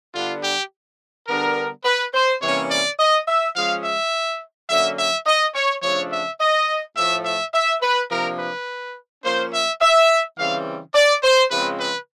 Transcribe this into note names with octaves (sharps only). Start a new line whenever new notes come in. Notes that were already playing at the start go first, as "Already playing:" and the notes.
D3 G3 B3 D4 F4
G4
D3 G3 B3 D4 A#4
B4
C5
C3 E3 G3 A#3 C#4 C#5
D5
D#5
E5
F3 G#3 C#4 F5
E5
D3 F#3 A#3 C#4 E5
E5
D#5
C#5
C#3 F3 A3 D4 C#5
E5
D#5
A2 F3 A3 E5
E5
E5
B4
C3 F3 A#3 D4 A#4
B4
F3 A#3 C#4 C5
E5
E5
C#3 E3 G3 C4 F5
D5
C5
C#3 F3 G#3 C4 B4
B4